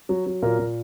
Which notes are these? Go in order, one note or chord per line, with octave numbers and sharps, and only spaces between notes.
F#3
F#3
A#2 A#4
A#2